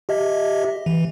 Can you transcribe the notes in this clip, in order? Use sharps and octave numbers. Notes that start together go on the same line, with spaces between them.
G4 D#5 E5
E3